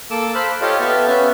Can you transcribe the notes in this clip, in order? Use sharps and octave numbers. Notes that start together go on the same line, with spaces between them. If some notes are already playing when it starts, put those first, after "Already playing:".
A#3 A4 D6 E6
A4 C5 F5 B5 F#6
F4 G4 A4 C#5 D#5 F5
B3 G4 A4 E5 F5 A5
B3 C#4 E5 F5